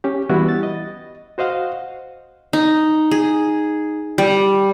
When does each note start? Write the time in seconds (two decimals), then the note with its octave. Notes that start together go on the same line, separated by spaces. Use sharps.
0.04 C#4 G4
0.29 E3 G3 B3 E4 F#4 G4
0.49 A6
0.63 D#5
1.38 F#4 C5 D#5 F5 F#5
2.53 D#4
3.11 G#4
4.18 G3